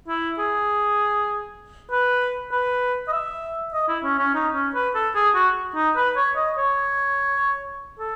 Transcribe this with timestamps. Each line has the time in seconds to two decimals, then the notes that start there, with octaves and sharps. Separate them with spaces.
0.08 E4
0.39 G#4
1.91 B4
2.52 B4
3.08 D#5
3.12 E5
3.73 D#5
3.88 E4
4.04 C#4
4.19 C#4
4.34 D#4
4.54 C#4
4.75 B4
4.95 A4
5.15 G#4
5.35 F#4
5.75 D#4
5.96 B4
6.16 C#5
6.36 D#5
6.57 C#5
7.99 A4